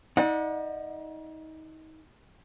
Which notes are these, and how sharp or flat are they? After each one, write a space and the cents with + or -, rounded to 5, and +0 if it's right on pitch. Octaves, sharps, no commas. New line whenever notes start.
D#4 +30 D5 +45 F#5 -25